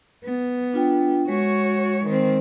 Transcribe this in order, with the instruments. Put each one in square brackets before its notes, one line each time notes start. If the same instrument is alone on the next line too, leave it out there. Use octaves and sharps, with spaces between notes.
[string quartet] B3
[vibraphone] D4 F4 G5
[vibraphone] G#3 [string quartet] F#4 C#5
[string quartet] D#3 C4